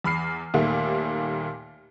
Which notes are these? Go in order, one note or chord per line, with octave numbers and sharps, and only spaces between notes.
E2 B5 F6 C7
D#2 A#2 G3 A3 A#3